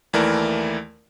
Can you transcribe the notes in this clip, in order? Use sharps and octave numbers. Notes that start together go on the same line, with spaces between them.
D#2 E3 A3 E4 A#4 D5